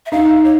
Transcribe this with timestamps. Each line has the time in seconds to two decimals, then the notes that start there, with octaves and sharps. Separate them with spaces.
0.06 E5
0.12 D#4 F5
0.44 C#5